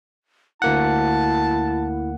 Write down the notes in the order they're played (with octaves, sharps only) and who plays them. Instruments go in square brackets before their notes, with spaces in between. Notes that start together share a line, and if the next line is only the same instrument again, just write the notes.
[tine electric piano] D2 A#3 F#5 [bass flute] E4 [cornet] A5